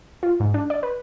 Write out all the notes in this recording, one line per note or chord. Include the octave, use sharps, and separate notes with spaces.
F4
G#2
D4
D5
B4